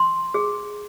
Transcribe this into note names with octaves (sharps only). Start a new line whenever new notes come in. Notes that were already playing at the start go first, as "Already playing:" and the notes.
Already playing: C6
G#4